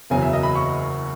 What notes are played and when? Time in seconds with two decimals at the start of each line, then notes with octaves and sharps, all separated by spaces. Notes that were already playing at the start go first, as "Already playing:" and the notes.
0.10 F#1 E2 C#3 F#3 G#5
0.22 E5
0.33 D#5
0.43 B5
0.55 C#6